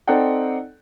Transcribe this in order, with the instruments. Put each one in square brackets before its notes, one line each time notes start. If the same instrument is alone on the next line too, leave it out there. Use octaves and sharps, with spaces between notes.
[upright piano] C4 D#4 A4 D5 F#5 G5